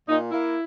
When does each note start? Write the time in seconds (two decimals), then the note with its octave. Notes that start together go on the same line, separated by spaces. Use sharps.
0.09 A#2 D#4
0.31 A#3 E4